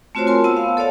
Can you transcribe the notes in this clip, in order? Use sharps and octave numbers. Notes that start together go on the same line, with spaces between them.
A3 C4 F4 F#4 C5 C#5
F4 A#4 G#5 A5 C6
B3 C5 F#5 A5 E6
F5
A4 C#5 D5 F5 A5